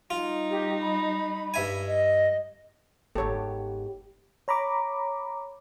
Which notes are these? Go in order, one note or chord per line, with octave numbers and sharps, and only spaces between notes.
G3 D#4 F4
G4
B5
G2 E5 G#5
D#5
G1 G#2 B3 G4 A4 C#5
C#5 A#5 B5 D6